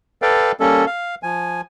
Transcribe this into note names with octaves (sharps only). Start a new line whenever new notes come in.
A4 B4 D5 F5 G5
G3 A#3 C#4 A4
F5
F3 G#5